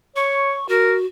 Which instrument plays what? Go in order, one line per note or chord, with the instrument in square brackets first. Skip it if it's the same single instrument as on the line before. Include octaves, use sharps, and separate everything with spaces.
[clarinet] C#5 [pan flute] C#6
[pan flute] F#4 [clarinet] A#4